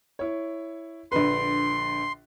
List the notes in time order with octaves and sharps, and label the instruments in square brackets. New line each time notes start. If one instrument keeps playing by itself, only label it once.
[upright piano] E4 C#5
[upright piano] A#1 D3 B4 [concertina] C6